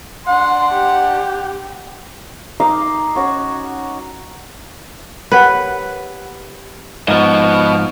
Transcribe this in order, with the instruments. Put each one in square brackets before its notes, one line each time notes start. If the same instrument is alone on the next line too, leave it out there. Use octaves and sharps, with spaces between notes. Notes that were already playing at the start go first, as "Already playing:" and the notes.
[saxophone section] D4 F#5 [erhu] C6
[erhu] G4
[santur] D#4 D#5 F5 D6
C#4 F#4 C#5
[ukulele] G4 C#5 F#5 [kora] B4
[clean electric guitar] G#2 F3 [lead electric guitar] B3 D#5